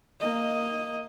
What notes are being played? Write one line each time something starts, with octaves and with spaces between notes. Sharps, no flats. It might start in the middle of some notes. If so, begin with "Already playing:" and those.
A#3 D#5